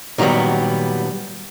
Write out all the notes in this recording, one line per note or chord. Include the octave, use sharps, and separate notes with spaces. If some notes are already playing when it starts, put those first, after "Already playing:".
A#2 D#3 F#3 G3 B3